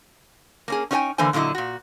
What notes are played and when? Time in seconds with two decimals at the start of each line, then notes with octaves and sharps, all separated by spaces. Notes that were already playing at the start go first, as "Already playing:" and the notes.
0.68 A#3 C#4 G#4
0.91 C#4 D#4 F#4 C#5 G5 G#5
1.18 D3 E3 A#3 C5 G#5
1.33 A#2 D3 F#3 E4 D#5
1.55 A#2 F#4